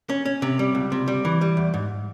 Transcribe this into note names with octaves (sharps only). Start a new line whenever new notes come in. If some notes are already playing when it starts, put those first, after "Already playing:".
C#4
C#4
C3
G3
C#2
C3
G3
E3
G3
E2
G#2